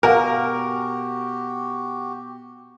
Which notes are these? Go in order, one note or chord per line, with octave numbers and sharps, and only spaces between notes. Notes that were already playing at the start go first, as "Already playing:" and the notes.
B2 F#4 G4 A#4 F5 F#5 G#5